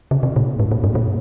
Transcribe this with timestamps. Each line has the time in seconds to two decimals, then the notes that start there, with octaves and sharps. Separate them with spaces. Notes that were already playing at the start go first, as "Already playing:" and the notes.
0.11 C#3
0.23 C3
0.36 A#2
0.60 G#2
0.71 A#2
0.84 G2
0.95 A#2